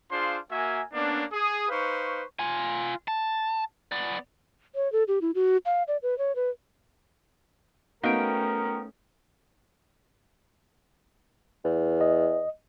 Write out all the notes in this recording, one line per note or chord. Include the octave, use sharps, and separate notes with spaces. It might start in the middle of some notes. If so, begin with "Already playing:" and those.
D4 F4 G#4 C5 F5 C6
A#3 F#4 A#4 E5 G#5
A#3 B3 C#4 D4
G#4 D#6
D#4 B4 C5 F5 C#6
F4 G#5
A5
B3 D5
C#5
A4
G4
E4
F#4
F5
D5
B4
C#5
B4
A3 B3 C#4 D#4 F#4 A#4 F5 G5
E2
D#5